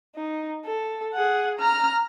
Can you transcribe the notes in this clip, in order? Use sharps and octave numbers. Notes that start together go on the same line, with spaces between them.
D#4
A4
G#4 F#5
A#5 F6